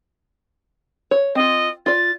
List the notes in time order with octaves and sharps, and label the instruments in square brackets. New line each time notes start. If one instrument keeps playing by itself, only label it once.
[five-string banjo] C#5
[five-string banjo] C4 F4 [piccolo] D#5
[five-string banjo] F4 D5 [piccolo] A6